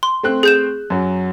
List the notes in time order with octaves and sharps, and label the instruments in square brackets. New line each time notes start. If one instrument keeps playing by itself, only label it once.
[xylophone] C6
[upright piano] A3 C4 F#6
[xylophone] G#4 G6 E7
[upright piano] F#2 F#3